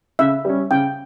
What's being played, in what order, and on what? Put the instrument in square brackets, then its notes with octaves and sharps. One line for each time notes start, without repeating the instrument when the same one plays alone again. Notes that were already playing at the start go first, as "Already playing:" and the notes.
[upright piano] C#3 [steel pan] E5
[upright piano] G3 C#4
[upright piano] C#3 [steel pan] G5